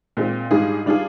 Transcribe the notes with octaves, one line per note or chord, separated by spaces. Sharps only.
A#2 G#3 C4
G#2 G3 D4 F4 G#4
G3 D4 F4 G#4